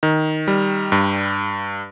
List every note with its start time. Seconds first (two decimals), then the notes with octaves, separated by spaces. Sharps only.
0.03 D#3
0.48 G3
0.92 G2